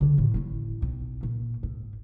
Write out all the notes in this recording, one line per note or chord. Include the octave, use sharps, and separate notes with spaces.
D3 E3
A2
A1 E4
B1
A#2
G#2